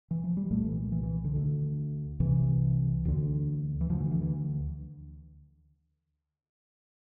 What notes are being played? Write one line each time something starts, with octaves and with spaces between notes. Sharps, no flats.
E3
F3
G3
C2 A#2 A3
E3
E3
E3
D3
D2 D3
C2 C3 E3
D2 D3
E3
D2 D3 F3
E3
E3
E3